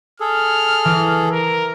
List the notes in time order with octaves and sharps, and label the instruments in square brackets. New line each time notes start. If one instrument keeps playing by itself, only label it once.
[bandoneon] G#4 A4 [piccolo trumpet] F6
[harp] E3
[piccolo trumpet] A#4